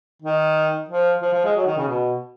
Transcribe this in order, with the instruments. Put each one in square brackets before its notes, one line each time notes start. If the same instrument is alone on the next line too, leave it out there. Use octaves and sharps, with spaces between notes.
[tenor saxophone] D#3
F3
F3
F3
G#3
F#3
D#3
C#3
B2